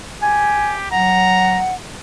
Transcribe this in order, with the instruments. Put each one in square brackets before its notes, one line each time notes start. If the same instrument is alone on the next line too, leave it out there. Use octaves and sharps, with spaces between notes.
[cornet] G4 [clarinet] G#5
[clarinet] F#3 [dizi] F#5 [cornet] A#5